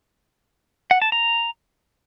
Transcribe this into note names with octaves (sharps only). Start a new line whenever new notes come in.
F#5
A5
A#5